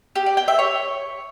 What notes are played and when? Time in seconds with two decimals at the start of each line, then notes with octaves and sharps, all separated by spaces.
0.16 G4
0.26 D5
0.37 G5
0.48 E5
0.59 C#5